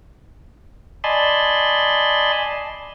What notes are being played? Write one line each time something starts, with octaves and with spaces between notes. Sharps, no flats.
D5 D#5 G#5 A5 B5 C6